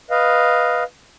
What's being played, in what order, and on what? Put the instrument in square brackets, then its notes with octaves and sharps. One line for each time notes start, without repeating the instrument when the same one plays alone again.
[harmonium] B4 D#5 F5